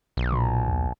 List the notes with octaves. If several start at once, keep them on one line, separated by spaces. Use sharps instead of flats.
B1
A#2
D#2